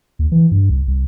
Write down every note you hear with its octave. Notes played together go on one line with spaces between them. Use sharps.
D#2
E3
G2
C2
C2